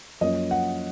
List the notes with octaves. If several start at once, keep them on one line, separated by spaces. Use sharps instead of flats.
F#2 F3 A#3 C#4 D#5
F#5